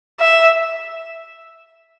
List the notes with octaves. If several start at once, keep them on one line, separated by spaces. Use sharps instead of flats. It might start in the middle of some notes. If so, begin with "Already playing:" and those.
E5